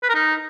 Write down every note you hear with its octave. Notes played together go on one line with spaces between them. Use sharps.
B4
A#4
D#4